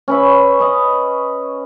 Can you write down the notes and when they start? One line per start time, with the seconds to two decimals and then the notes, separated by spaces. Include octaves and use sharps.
0.08 C#4 B4 E5
0.60 B4 D#5